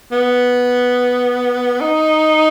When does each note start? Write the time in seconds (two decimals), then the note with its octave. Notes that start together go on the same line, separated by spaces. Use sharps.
0.11 B3
1.81 D#4